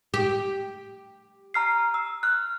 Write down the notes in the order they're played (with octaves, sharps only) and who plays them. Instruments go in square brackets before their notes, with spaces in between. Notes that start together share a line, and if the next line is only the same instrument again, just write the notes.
[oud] G4
[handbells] A#5 F6 C7
E6
F6 F#6